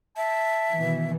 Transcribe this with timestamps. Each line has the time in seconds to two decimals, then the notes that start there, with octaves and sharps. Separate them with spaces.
0.17 E5 A5
0.74 B2 D#3 E3